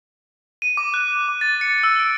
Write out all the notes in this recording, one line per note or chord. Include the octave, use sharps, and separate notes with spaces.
D#7
D6
F#6
D6
A6
C#7
E6
D7